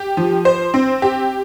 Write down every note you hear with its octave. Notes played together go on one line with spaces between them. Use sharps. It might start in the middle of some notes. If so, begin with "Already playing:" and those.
Already playing: G4
F3
C5
C4
G4